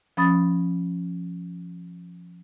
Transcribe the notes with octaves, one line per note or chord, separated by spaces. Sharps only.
F3 C#4 B5 D#6 A6